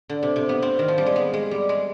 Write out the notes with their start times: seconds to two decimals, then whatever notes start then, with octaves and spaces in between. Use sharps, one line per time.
0.09 D3
0.23 C3
0.36 C3
0.49 B3
0.62 C4
0.79 D#3
0.88 F3
0.98 G3
1.06 G#3
1.16 B3
1.34 G#3
1.51 G3
1.69 G#3